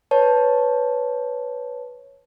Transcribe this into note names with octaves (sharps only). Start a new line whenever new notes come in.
B4 C#5 A5